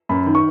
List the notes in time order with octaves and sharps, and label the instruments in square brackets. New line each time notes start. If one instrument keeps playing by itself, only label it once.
[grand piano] F#2 [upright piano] B5
[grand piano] D#3
[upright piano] C#6